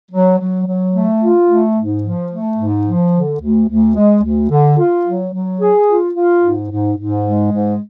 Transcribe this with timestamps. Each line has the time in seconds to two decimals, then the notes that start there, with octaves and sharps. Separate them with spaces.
0.11 F#3
0.39 F#3
0.66 F#3
0.93 A3
1.21 F4
1.49 A3
1.76 G#2
2.04 F3
2.31 A3
2.58 G#2
2.86 F3
3.13 D3
3.41 D2
3.68 D2
3.96 G#3
4.23 D2
4.50 D3
4.78 F4
5.05 F#3
5.33 F#3
5.60 G#4
5.87 F4
6.14 F4
6.42 G#2
6.69 G#2
6.97 G#2
7.24 G#3
7.51 G#2